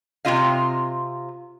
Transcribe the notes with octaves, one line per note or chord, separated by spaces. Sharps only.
C3 A#3 C4 F4 D#5 F5